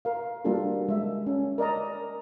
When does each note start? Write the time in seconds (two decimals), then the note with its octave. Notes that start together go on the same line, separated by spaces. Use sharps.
0.05 A#4 F5
0.45 G3 A#3 D4 F4 F#4 A4
0.89 G#3 E5
1.26 C#4
1.58 A#4 D5 D#5 A#5